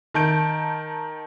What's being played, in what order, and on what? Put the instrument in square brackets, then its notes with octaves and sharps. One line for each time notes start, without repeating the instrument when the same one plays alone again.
[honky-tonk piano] D#3 A5 G6 D7